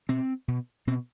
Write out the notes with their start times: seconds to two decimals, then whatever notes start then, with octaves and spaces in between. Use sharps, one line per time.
0.09 B2 C4
0.48 B2
0.87 B2 C4